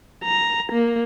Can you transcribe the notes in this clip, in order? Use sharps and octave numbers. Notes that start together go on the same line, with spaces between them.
A#5
A#3